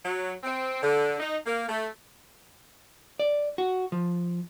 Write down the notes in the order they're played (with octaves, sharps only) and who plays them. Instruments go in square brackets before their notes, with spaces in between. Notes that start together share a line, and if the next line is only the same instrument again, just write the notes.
[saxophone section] F#3
C4
D3
D#4
A#3
A3
[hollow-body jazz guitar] D5
F#4
F3